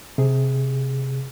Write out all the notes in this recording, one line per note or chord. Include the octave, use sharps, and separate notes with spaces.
C3 G#4